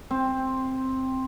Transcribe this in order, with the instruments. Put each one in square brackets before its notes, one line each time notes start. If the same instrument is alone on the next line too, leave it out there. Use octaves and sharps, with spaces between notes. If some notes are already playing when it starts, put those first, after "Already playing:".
[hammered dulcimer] C4